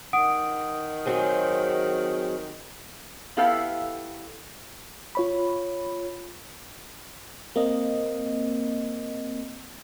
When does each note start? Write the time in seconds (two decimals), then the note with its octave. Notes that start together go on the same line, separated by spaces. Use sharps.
0.13 D#3 F#5 D#6 D7
1.06 F#3 C4 G#4
3.37 B3 E4 G4 A4 F5
5.15 F4 C#5 B5
7.56 A#3 C4 D#5